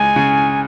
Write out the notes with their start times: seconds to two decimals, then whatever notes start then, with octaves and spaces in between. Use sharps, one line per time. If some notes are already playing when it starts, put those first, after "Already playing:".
Already playing: C#2 G#3 G#5
0.16 C#3